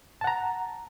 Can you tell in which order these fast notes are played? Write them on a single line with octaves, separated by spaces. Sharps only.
A5 F#5 A#5